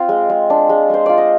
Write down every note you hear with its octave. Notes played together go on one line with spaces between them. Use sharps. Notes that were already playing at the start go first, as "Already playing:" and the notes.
Already playing: C4 F4 G5
G#3
G#3
D4
G#3
G#3 C5
F4 D5
D#5